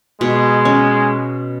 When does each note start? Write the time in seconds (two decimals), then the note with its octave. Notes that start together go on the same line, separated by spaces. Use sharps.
0.21 B2 G#3
0.65 C#4